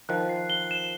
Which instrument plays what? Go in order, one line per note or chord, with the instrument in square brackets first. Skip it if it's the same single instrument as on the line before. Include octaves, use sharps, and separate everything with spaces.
[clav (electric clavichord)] D#3 F3 [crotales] F#6
[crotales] C7
G7
E7